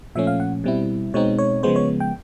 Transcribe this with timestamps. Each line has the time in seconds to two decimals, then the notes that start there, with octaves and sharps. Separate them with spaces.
0.15 A#2 F3 A3 C#4 E5
0.27 F5
0.40 F#5
0.64 B2 G3 C4 E4
1.14 B2 G#3 C4 D#4 C#5
1.38 C#5
1.63 C#3 F3 G#3 B3 C5
1.76 C#5
2.00 G5